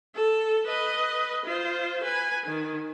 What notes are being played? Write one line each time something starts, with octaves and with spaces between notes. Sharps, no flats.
A4
B4 D#5
F4 C5
B4 G#5
D#3